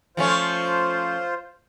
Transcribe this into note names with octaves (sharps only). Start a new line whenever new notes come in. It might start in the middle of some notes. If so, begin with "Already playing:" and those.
F3 A3 C#4 F4 C5